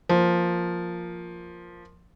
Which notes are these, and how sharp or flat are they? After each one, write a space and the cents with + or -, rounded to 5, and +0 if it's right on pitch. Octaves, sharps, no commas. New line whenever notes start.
F3 +0 A#3 +0